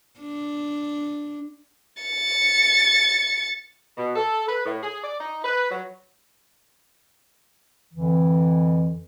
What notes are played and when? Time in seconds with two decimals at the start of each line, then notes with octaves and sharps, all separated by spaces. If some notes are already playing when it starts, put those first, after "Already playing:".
0.20 D4
2.03 A6 C#7
3.97 B2
4.16 A4
4.47 B4
4.65 A2
4.82 G#4
5.03 D5
5.19 D#4
5.44 B4
5.70 F#3
7.94 F2 D3 E3